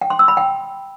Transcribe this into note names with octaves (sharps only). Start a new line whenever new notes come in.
G5
C6
E6
B5
G5